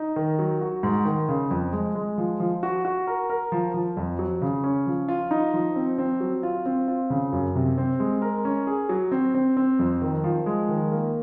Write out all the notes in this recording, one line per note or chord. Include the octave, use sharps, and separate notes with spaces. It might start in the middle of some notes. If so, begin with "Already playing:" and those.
Already playing: D#4
D#3
F#3
F#4
G#2
D#3
C#3
F2
G#3
G#3
F3
F3
F#4
F#4
A#4
A#4
F3
F3
F2
F#3
C#3
C#4
F3
F4
D#4
F3
C4
C4
F#3
F4
C4
F4
C#3
F#2
C3
C4
G#3
A#4
C#4
G#4
F#3
C4
C4
C4
F2
D#3
F3
G#3
D#3
A#3